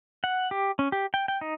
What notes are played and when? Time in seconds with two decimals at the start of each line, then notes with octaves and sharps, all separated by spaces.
0.24 F#5
0.51 G4
0.79 C#4
0.92 G4
1.14 G5
1.28 G5
1.41 D#4